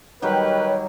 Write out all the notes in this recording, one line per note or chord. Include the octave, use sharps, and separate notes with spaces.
D#3 F#3 G3 G4 A#4 B4 C#5